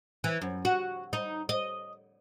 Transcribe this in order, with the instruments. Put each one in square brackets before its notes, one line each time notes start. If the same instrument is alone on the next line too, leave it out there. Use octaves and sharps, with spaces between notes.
[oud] E3
F#2
F#4
D#4
D#5